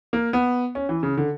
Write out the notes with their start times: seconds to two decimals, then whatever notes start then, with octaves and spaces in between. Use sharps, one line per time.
0.13 A#3
0.33 B3
0.75 C#4
0.89 E3
1.03 C#3
1.17 D3